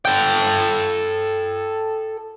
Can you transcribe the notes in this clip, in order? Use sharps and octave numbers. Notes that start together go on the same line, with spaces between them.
A4 G5